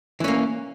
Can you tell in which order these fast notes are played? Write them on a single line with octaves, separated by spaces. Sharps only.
E3 C#4 A#3